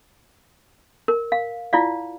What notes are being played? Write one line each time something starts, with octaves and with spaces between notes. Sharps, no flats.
A#4
F5
E4 F4 D5 F5